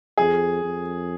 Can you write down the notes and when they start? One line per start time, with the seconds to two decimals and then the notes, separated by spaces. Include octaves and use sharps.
0.18 F2 G#4
0.64 F2